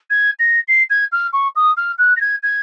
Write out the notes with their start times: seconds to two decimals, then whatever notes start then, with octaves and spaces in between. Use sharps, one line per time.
0.10 G#6
0.39 A#6
0.68 C7
0.90 G#6
1.12 F6
1.33 C#6
1.56 D#6
1.77 F6
1.98 F#6
2.16 A#6
2.20 G#6
2.43 G#6